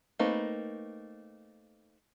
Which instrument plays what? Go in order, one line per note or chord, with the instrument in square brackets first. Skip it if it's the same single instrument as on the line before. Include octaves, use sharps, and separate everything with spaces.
[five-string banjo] A3 A#3 C4 D#4 B4